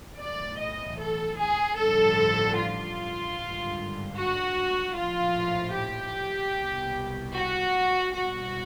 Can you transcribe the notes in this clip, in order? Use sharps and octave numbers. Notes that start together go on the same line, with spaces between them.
B1 A2 E3 D5
D#5
A4
G#4
A1 G2 D3 F3 A4
F4
G#1 G2 D3
F#4
A#1 A2 F3 F4
G4
C2 B2
F#4
C2 B2 F#4